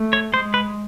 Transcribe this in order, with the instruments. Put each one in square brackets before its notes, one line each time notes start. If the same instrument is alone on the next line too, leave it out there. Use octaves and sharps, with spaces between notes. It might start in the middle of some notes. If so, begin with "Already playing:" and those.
Already playing: [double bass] A3
[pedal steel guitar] C#5
[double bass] G#3 [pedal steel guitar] C5
[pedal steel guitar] B4